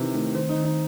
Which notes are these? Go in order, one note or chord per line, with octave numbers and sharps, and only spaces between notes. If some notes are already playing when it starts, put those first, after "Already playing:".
Already playing: C3 D#3 E3
D#3 A3
D#3 C4
D#4
D#3
D#4